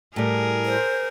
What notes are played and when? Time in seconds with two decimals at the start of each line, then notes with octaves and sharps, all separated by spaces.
0.16 A2 G3 G#4 A#4
0.66 C5